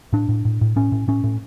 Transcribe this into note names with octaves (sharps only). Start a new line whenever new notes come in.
A2 D4
A2
A2
A2
A2 C#4
A2
A2 C#4
A2